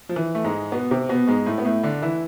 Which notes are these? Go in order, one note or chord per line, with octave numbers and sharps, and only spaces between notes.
F3
E3
A3
G#2 G#3
B2 B3
C3 C4
B2 B3
G#2 G#3
A2 A3
B3
A2 A3
D3 D4
E3 E4